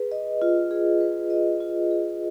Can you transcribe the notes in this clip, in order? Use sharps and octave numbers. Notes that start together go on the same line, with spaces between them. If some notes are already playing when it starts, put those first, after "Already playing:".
Already playing: G#4 B4
D#5
F4
G#4
B4
D#5
F4
G#4